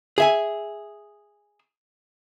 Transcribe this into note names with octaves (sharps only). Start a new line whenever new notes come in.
G#4 E5 G#5